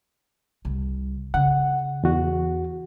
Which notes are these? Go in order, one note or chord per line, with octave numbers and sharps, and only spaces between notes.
C2
C#3 F#5
E2 F#4